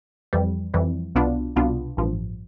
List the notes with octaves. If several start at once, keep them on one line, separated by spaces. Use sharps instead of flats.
F2 E3 G3
F2 E3 G3
C2 B2 B3 D4 F4
C2 B2 B3 D4 F4
A1 G2 F3